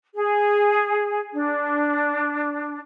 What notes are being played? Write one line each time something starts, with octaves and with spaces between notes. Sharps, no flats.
G#4
D4